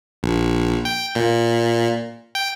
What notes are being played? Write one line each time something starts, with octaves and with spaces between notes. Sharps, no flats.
A#1
G5
A#2
G5